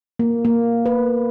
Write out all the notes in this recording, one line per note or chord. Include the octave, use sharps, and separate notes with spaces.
A#3
A#3
B4